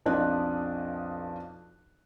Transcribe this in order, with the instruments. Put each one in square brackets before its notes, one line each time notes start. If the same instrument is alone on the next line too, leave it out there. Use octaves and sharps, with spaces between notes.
[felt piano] B1 F2 F3 D4 D#5 F#6